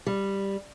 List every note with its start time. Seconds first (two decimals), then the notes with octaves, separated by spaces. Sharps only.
0.06 G3